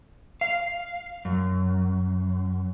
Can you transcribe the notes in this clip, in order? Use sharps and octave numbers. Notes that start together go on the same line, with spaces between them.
F5
F#2